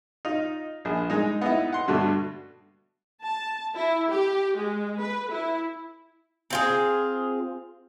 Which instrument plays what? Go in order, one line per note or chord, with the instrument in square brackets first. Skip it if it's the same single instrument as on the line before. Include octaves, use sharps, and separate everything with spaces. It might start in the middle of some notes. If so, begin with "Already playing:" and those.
[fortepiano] D#4 F4
A#1 G#4
G#3 D#4
B3 D#4 E4
F#5 C6
G2 B2 D3 A3
[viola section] A5
E4
G4
G#3
B4
E4
[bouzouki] C4 F4 G#4